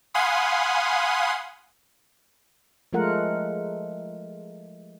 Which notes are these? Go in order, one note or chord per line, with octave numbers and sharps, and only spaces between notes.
F5 F#5 G#5 B5 C6 D#6
F3 G#3 A3 F4 A#4 F#5